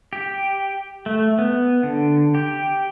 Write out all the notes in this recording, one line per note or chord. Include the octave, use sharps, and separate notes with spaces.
G4
A3
B3
D3
G4